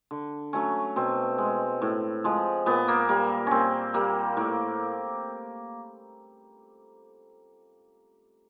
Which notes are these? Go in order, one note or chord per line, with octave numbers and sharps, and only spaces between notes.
D3
F#3 A3 C#4
B2 C4
G#3
A2
F3 G#3
A#2 B3
A#3
G3 A#3
A#2 C4 C#4
G3 A#3
A2 A#3